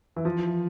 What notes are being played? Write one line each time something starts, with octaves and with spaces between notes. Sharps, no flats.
E3
F3